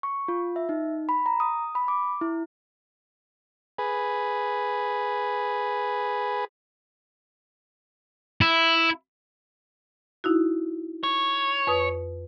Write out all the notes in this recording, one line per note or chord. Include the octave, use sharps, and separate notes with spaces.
C#6
F4
E5
D#4
B5
A#5
D#6
B5
D6
E4
G#4 B4
E4
D#4 E4 F#4
C#5
F2 B4 D#6